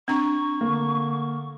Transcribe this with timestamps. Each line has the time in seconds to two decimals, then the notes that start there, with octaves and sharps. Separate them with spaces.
0.08 C4 D4 A#5 C#6
0.61 D3 A#3